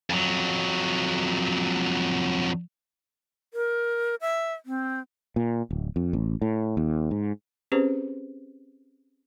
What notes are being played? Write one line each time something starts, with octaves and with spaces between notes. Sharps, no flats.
F2 F#3
A#4
E5
C4
A#2
D1
F2
A1
A2
D#2
G#2
C4 C#4 G4 G#4 B4 C5